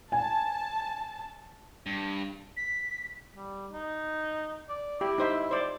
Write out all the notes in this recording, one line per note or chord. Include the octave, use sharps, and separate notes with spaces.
G#5 A5
G2
B6
G3
D#4
D5
E4 G4
D#4 C5 E5
C5 D5